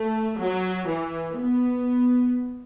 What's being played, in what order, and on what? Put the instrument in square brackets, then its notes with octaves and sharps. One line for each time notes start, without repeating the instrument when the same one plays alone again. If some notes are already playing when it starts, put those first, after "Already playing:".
Already playing: [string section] A3
F#3
E3
B3